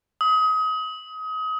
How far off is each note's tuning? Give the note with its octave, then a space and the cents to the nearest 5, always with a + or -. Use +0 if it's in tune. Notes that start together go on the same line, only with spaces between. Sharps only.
D#6 +30